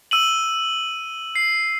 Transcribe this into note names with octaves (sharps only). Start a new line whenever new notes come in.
E6 D#7 F#7
C7